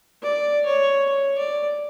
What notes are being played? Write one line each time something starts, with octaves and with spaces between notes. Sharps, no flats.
D5
C#5
C#5
D5